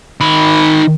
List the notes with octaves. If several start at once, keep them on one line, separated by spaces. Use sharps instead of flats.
D#3 B5